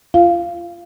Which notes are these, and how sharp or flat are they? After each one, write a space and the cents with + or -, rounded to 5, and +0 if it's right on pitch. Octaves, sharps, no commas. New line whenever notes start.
F4 -25 F5 -10